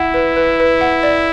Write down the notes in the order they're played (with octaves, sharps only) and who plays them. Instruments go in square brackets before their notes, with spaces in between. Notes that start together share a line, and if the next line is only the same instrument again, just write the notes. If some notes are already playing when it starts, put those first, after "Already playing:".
Already playing: [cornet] E4 [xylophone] F#5
[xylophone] B4
B4
B4
F#5
D5